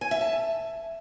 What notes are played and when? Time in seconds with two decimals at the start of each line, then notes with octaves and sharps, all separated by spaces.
0.01 G#5
0.11 E5
0.21 A5